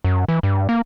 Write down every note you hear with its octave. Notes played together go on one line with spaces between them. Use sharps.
F#2
E3
G2
A#3